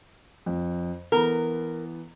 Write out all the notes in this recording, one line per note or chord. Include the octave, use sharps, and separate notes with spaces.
F2
E3 B3 A#4